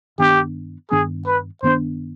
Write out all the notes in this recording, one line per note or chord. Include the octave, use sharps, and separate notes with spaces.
G2 D#3 B3 D4 G4
G2 D#3 B3 D4 G#4
B4
G2 D#3 B3 D4 C5